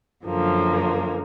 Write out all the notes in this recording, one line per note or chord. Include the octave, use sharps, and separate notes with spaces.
F#2 D3 F3 A#3